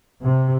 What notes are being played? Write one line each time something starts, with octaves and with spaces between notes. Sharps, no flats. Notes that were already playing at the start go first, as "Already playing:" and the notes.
C3